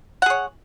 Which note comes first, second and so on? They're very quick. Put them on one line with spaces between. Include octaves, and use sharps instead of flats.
F#5 G#4 C#5